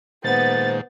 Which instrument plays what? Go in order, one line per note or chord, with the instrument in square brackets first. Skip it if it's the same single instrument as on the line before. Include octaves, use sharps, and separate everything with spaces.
[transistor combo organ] A#2 D#3 G#3 [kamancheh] B3 [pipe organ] C5 [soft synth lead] A6